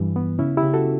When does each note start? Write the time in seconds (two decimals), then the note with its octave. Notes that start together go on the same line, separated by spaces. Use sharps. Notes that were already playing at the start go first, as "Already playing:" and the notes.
Already playing: G2 E3
0.16 B3
0.39 C#3 C#4 E4
0.57 E4 G4
0.63 C#3
0.74 F#4 A4